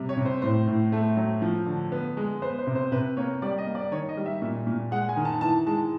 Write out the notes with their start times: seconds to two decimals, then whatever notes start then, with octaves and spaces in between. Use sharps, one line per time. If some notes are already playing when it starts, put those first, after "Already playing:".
Already playing: C3 G3
0.09 C#5
0.17 C3
0.25 C5
0.42 A2 C5
0.67 A2
0.92 A3
1.17 F#3
1.42 F3
1.66 D3
1.92 B3
2.17 G#3
2.42 B3 C5
2.59 C5
2.67 C3
2.75 C5
2.92 C3 B4
3.17 A#3 C#5
3.42 G3 D5
3.58 D#5
3.67 A#3
3.75 D5
3.91 D#3 C#5
4.09 D#5
4.17 G3
4.26 E5
4.42 A#2
4.66 A#2
4.91 G#3 F#5
5.09 G#5
5.17 D#3
5.25 A5
5.41 E3 A5
5.66 G#3 A5